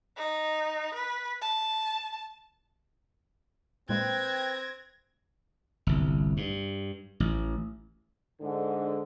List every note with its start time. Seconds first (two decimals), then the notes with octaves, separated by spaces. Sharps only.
0.17 D#4
0.94 B4
1.42 A5
3.89 A#2 G#3 A#3 C4 B4 G5 G#6 A#6
5.87 G1 C2
6.37 G2
7.20 A1
8.41 G#2 D3